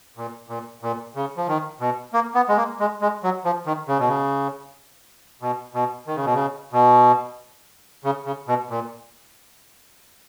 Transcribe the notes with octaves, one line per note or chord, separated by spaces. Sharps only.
A#2
A#2
A#2
C#3
F3
D#3
B2
A#3
B3
G#3
A#3
G#3
G#3
F#3
F3
D#3
C#3
B2
C#3
B2
B2
D#3
C#3
B2
C#3
B2
C#3
C#3
B2
A#2